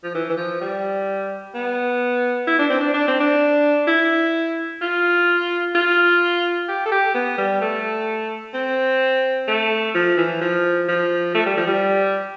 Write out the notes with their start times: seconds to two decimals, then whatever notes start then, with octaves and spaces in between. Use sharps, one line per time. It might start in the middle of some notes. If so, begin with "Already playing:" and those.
0.03 F3
0.14 E3
0.29 E3
0.37 F3
0.61 G3
1.55 B3
2.47 E4
2.59 D4
2.70 C4
2.80 D4
2.94 D4
3.08 C4
3.20 D4
3.87 E4
4.81 F4
5.75 F4
6.68 G4
6.86 A4
6.91 G4
7.14 B3
7.38 G3
7.61 A3
8.54 C4
9.48 A3
9.95 F3
10.17 E3
10.41 F3
10.88 F3
11.35 A3
11.46 G3
11.57 F3
11.67 G3